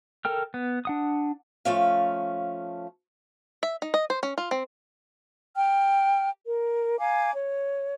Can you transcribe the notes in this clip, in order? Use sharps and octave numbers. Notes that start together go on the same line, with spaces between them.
A4 A#4 G5 F6
B3
D4 F#5 D#6
F3 A3 C#4 F5
E5
D#4
D#5
C5
C#4
F4
C4
G5 F6
A#4
F5 G#5 A#5 D6
C#5